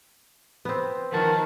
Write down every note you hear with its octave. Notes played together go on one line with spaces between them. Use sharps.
B3 C4
D#3 F3 F#4 A#4 A5